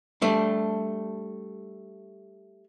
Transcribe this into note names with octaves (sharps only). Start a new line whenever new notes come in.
G3 A3 D4